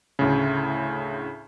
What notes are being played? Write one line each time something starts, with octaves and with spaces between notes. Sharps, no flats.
D2 A2 C#3